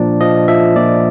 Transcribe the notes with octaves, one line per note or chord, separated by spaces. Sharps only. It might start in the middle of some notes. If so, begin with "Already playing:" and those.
Already playing: A#2 F3 D4 D5
F3 D#5
F3 E5
A#2 D5